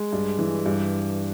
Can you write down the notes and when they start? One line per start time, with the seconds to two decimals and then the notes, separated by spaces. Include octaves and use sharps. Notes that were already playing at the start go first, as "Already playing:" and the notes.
Already playing: G#3
0.12 G2
0.39 E3
0.66 G2